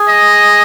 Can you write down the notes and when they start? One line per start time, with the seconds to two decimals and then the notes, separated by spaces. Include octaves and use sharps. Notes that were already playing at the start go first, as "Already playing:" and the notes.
Already playing: G#4
0.08 D#5